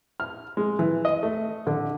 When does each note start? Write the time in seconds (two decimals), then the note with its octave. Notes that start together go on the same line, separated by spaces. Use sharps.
0.20 F6
0.57 G#3
0.79 E3
1.05 D#5
1.23 A3
1.67 D3